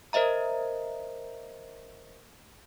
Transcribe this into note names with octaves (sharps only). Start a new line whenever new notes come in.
A#4 C5 D#5 E5 A#5